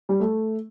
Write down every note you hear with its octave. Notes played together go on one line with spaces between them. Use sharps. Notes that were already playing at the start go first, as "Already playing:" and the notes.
G3
A3